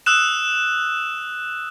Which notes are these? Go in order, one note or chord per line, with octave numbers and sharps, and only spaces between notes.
D#6 E6 F#6 E7